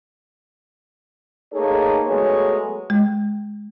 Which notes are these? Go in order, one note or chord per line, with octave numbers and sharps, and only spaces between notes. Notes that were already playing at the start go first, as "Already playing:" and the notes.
A3 A#3 D#4 G#4 A4 C#5
F#3 G#3 A3 B3 G#4 C#5
G#3